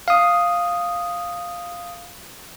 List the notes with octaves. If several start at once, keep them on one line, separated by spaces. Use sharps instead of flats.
F5 D#6